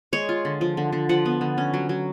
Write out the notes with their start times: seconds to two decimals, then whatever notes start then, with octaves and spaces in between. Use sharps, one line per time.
0.13 G#3 C#5
0.29 F4
0.45 D3
0.61 F3
0.77 D3
0.92 D3
1.09 F3 F#5
1.25 B3
1.41 D3
1.58 C#4
1.74 F#3
1.89 F#3